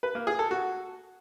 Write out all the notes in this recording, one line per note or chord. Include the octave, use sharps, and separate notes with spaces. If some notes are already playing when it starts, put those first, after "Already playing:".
B4
A#3
G#4
A4
F#4